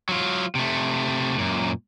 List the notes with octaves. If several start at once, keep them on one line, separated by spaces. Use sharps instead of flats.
F#3 F4
C3 A3
F#2 A#2